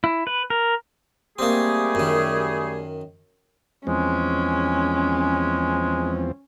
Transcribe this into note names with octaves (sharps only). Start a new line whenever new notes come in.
E4
B4
A#4
G3 A3 A#3 C4 G#4
F#2 D#3
E2 F3 G#3 C4 C#4